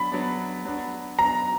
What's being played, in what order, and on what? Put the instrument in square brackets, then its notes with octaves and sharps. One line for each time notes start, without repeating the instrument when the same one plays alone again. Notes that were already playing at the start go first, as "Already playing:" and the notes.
Already playing: [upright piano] F#3 B3 D4 [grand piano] B5
[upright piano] F#3 B3 D4
F#3 B3 D4
[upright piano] F#3 B3 D4 [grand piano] A#5